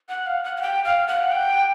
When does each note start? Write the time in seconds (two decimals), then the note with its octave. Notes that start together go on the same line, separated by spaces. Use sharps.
0.09 F#5
0.27 F5
0.44 F#5
0.57 F#5
0.62 G5
0.84 F5
1.08 F#5
1.31 G5